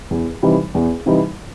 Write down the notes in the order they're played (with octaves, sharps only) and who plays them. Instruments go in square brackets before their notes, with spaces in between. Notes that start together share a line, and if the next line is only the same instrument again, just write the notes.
[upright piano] E2
C3 E3 G3 D#4
E2
C3 E3 G3 D#4